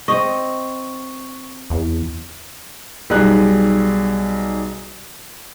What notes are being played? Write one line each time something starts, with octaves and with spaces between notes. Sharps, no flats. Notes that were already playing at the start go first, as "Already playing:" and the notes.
C4 D#5 C#6
E2
B1 G3 D#4 G#4 F#6